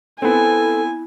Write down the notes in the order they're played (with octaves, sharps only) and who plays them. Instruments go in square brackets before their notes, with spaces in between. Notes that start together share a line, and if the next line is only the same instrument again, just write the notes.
[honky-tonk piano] B3 C4 [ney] E4 [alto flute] A4 [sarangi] G#5